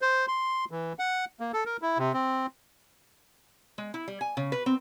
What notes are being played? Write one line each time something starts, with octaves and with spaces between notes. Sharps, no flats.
C5
C6
E3
F#5
A#3
A4
A#4
E4
C3
C4
G#3
E4
G3
G#5
C#3
B4
C4